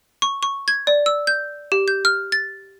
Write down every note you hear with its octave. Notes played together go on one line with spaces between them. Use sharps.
C#6
C#6
G#6
D5
E6
G6
G4
G6
F6
A6